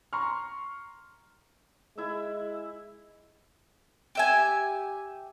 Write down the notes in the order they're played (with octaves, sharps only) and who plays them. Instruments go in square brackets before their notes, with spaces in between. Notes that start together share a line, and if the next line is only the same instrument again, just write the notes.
[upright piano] A#5 C6 C#6 F6
[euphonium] G#3 [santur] E4 E5
[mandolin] G4 E5 G#5